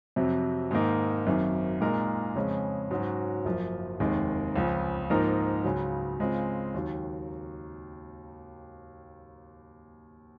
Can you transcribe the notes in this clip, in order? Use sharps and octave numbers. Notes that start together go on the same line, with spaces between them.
F2 C3 F#3
G#2 D#3 A#3 D#4
G#1 F#2 D#3
A#2 G#3 D#4 A#4
F2 C#3 G#3 C#4
G#2 F#3 C#4 F#4
F#1 F#2 F3
F1 D#2 D#3 G#3
C#2 C#3 F3
G#2 F3 A#3 D#4 A#4
C#2 C#3 F#3
C#3 G#3 C4 F4
D#2 D#3 F#3